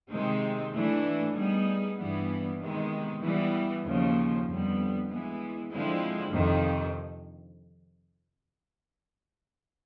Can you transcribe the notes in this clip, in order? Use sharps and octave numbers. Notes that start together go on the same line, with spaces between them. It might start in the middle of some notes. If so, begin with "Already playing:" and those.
C3 D#3 G#3 C4
E3 A3 D4
G3 B3 D#4 G#4
G2 E3 G3 B3 D4
C3 D#3 G#3 B3
E3 G3 B3
D#2 C#3 F3
F2 D3 G3 B3
E3 G#3 B3
D3 F3 G#3 C4 E4
F2 C3 D#3